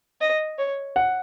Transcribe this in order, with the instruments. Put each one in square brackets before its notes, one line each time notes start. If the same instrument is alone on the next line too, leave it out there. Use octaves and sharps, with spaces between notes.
[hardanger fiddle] D#5
C#5
[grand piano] F#5